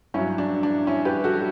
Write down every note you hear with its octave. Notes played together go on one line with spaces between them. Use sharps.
G2 F#3 C#4 E4
D4
D4
C#4 E4
G4 B4
F#4 A4